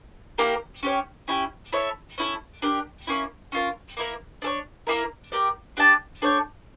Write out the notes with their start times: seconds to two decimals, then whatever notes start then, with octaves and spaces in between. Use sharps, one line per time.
0.38 A#3 E4 G4 A#4
0.83 C#4 G4 C#5
1.28 C#4 E4 G4
1.73 E4 A4 C#5 E5
2.18 C#4 E4 A4
2.62 D4 G4 A#4
3.07 A#3 C#4 E4
3.52 C#4 F4 A#4
3.97 A#3 E4 A#4
4.42 D4 A4 C#5
4.87 A#3 E4 A#4
5.32 G4 A#4 D5
5.77 D4 G4 D5 A5
6.22 D4 A4 C#5 G5